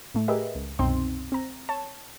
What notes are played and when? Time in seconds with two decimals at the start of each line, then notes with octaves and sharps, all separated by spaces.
0.15 A2 A3
0.28 G4 G#4 A#4 B4 D#5 E5
0.55 C#2
0.79 C2 F#2 B2 C4 D#4 C6
1.32 C4 A#5
1.69 C#5 A5